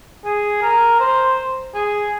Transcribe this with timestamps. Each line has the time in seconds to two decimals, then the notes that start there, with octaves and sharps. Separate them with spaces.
0.25 G#4
0.62 A#4
1.00 C5
1.74 G#4